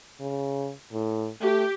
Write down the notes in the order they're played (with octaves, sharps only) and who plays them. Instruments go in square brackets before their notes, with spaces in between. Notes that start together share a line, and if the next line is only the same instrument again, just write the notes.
[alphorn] C#3
A2
[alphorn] A3 [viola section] G4